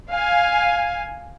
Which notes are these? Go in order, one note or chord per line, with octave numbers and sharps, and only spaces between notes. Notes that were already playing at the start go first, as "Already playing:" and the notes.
F5 G#5